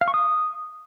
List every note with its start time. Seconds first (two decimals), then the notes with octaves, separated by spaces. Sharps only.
0.01 F5
0.08 C#6
0.14 D#6